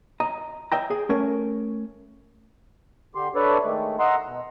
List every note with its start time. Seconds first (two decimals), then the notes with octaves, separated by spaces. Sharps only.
0.20 D#5 A#5
0.72 D#5 E5 G5 A#5
0.90 G#4
1.09 A3 C#4 A#4
3.15 D3 G4 C6
3.35 D4 A4 B4 C#5 D5 E5
3.65 D#3 G#3 A3
3.99 D#5 F#5 A#5 C6 E6
4.26 B2